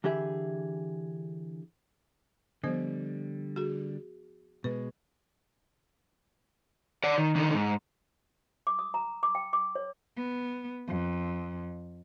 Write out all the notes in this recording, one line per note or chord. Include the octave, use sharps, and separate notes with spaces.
D3 E3 G4 G#4 E5
D3 F3 G3 B3 C5
F#4 G#4
B2 G#3 B4
D5 F#5
D#3
D3 D#3
G#2
D6
D#6
A#5
D6
G5
D6
C#5
B3
F2